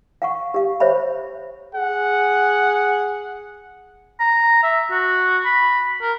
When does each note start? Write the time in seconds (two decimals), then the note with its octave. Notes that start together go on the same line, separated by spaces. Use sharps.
0.22 F5 F#5 C#6
0.54 G4 F5
0.80 C5 C#5 E5 B5
1.75 G#4 F#5
4.20 A#5
4.63 E5
4.91 F#4
5.45 B5
6.01 A#4